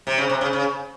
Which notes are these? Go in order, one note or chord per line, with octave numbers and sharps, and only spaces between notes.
C3
C#3
C3
C#3
C#3